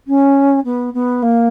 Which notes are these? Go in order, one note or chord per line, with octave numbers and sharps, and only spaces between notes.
C#4
B3
B3
A#3